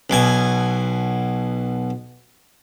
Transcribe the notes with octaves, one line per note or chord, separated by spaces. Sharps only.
B1 B2 G#5